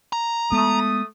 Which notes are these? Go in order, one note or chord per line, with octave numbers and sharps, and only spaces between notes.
A#5
G#3 A3 B3 D#6